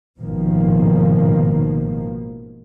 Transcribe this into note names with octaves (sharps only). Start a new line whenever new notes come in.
A1 G#2 B2 D#3 F3 A#3